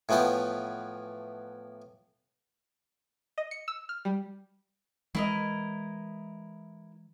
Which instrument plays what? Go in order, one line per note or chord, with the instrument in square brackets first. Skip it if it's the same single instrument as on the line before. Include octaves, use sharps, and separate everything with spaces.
[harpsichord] A2 E3 F3 B3 G5
[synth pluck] D#5
C#7
E6
F6
G3
[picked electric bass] E3 G#3 [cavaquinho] E4 A#4 D#5